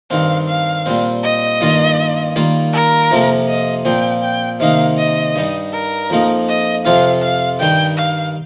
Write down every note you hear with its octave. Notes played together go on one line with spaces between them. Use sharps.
G2 D#3 C4 F5
F5
A#2 G3 C4
D#5
G2 D#3 A#3 F4
D#3 G3 A#3 F4
A#4
F2 C3 F3 A#3
D#5
A#2 F3 C4 G5
G5
C3 D#3 A#3 D#4 F5
D#5
G2 G3 D#4
A#4
F2 F3 A#3 D#4
D#5
F2 C3 F3 C4 F4 F5
F5
G2 D#3 G3 G5
F5